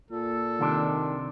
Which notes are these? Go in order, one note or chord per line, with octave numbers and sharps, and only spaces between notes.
A#2 A4
C2 C3 D#3 D4